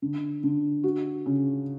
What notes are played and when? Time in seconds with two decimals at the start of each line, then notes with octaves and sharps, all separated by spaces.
0.02 D3
0.43 D3
0.84 F#4
1.26 C#3